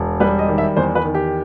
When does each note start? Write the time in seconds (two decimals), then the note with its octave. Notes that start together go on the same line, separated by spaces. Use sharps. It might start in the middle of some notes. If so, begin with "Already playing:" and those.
Already playing: E1
0.20 G3 B4
0.39 D#5
0.48 D#3
0.58 E5
0.77 E2 C5
0.95 B4
1.05 D#3
1.14 G4